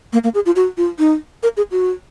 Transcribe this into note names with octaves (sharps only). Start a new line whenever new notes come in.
A#3
A#3
G#4
F4
F#4
F4
D#4
A#4
G#4
F#4